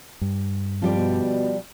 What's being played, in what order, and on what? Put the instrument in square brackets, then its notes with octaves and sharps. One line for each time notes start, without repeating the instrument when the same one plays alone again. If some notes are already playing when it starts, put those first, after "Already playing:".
[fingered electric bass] G2
[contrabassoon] F2 [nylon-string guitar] F3 G3 D5
[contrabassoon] B2